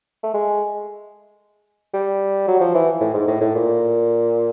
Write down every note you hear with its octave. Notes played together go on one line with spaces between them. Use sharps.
A3
G#3
G3
F#3
F3
E3
A2
G#2
A2
A2
A#2